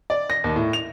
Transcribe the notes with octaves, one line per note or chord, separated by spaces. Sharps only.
D5
A#6
D#2
A2
F7